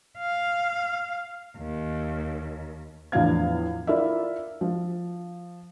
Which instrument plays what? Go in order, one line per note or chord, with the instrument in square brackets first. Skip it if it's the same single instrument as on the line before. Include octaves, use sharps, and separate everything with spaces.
[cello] F5
D#2
[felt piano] E2 A2 F3 D4 F5 G#6
E4 F4 A#4 D5 E5
F3